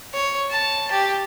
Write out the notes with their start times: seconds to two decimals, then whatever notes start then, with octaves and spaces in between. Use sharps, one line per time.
0.14 C#5
0.50 A5
0.91 G4